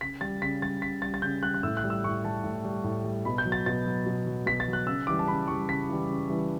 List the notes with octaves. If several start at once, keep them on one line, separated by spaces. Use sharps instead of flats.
C#3 B6
G3 A6
C#3 B6
G3 A6
C#3 B6
G3 A6
A6
C#3 G6
G3 F#6
F#6
A2 E6
F#6
G3
E6
A2 C#6
G3 A5
A2
G3
A2
G3
B2 B5
G6
F#3
A6
B2 A6
F#3
B2
F#3
B2 B6
A6
F#3
F#6
C#3 E6
E3 G3 D6
A5
C#3 B5
E3 G3 C#6
C#3 B6
E3 G3
C#3
E3 G3